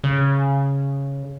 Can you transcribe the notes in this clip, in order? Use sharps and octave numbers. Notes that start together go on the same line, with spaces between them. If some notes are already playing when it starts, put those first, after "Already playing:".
C#3